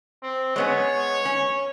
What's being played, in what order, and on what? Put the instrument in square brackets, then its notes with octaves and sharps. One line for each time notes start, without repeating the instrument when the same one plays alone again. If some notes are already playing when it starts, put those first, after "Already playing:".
[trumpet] C4
[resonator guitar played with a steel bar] G#3 B3 C#4 [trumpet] C#5
[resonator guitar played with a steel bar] C#4